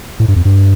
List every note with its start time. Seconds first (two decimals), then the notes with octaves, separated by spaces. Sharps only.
0.20 A2
0.28 G2
0.36 F2
0.45 G2